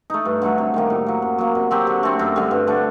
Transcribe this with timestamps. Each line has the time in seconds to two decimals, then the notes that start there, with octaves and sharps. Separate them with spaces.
0.10 A3 D#4
0.25 G2
0.42 D3 F#3 A3
0.58 C3
0.74 D#3 G3 A#3
0.90 A2
1.07 F#3 A#3
1.22 F#2
1.38 F#3 A#3
1.55 C3
1.71 F#3 C4 G4
1.87 D3
2.03 A3 C4
2.19 F#2
2.36 D3 G3
2.51 G2
2.67 D3 A3 D4